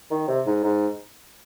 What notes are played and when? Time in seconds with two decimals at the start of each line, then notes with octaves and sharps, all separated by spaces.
0.11 D#3
0.28 C3
0.46 G#2
0.64 G#2